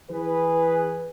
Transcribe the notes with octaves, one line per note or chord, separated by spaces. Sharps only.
E3 G#4 B4